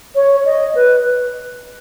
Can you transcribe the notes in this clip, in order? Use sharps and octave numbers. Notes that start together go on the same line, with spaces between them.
C#5
D#5
B4